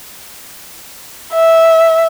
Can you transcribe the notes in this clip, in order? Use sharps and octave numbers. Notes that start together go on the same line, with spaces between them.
E5